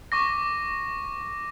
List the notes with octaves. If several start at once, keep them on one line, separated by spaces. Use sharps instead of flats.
C#6 D6 A#6